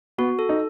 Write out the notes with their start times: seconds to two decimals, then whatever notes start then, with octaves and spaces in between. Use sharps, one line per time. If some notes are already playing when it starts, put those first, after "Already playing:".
0.18 B3 F#4
0.39 A4
0.49 D#4